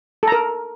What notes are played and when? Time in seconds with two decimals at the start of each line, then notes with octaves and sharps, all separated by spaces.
0.23 A4
0.28 A#5
0.32 A#4